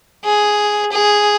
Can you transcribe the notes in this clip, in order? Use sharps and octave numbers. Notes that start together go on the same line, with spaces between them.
G#4
G#4